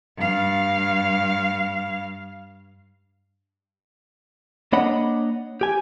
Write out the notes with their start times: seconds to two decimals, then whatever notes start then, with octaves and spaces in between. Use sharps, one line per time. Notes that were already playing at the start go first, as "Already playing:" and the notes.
0.17 G2 F5
4.73 A#3 D4 C#5 D#5 F#5 B5
5.61 G4 G#5